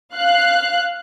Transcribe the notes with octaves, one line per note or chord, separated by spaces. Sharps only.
F5 F#6